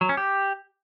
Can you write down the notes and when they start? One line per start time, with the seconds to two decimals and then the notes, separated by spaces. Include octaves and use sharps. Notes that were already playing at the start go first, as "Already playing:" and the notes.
0.01 F#3
0.09 C#4
0.17 G4